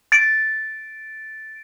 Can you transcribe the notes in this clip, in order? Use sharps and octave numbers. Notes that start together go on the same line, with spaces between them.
A6 D7